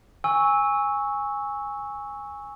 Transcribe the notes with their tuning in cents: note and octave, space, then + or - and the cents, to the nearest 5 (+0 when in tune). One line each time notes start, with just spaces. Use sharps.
G#5 -15 C#6 +0 E6 -15